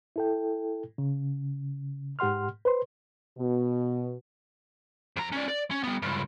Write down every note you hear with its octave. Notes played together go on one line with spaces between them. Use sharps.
E4 A4 G5
C#3
G#2 G4 F#5 C6 F6
B4 C5 C6
B2
F2 A#5
C#4 D5
D5
C#4
G3 B3
C#2 G2